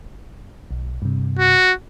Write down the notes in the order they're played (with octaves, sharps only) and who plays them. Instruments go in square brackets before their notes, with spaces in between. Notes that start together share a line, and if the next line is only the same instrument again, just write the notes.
[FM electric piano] B1
G2 C3
[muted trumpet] F#4